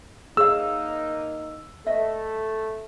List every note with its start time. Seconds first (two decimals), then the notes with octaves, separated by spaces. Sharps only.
0.37 A#3 D#4 G#4 C#5 F5 E6
1.86 A3 A4 B4 D#5 E5